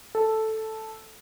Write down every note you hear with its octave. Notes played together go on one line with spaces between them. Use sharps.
A4